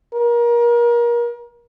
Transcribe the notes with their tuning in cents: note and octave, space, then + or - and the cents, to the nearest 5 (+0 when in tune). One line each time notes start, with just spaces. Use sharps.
A#4 +30